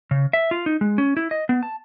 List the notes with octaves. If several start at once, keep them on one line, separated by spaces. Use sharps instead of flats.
C#3
E5
F4
D#4
G#3
C#4
E4
D#5
B3
A5